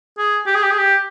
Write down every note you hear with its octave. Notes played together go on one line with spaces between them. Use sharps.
G#4
G4
G#4
G4
G#4
G4